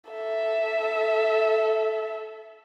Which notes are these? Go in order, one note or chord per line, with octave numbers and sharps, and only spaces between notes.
A4 E5